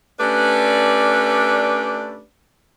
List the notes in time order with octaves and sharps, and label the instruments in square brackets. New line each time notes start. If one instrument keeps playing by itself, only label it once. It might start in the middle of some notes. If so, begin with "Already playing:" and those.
[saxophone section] A3 C#4 D4 G4 B4 D5